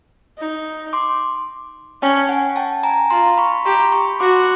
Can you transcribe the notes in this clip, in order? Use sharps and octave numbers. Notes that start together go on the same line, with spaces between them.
D#4
C6 D6
C#4 G5 A5
F#5 G#5
G5 A5
G#5 A#5
F4 A#5 C6
B5 C#6
G4 A#5 C6
B5 C#6
F#4 C6 D6